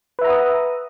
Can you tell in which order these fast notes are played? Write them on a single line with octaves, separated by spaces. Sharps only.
B4 E5 A#5 F#5 D#6